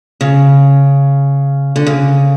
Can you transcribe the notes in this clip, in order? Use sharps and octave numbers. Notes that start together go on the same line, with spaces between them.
C#3
D3
C#3